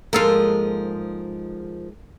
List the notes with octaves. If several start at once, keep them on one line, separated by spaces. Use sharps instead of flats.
G#2 F3 G#3 A#3 F4 A4 A#4 F5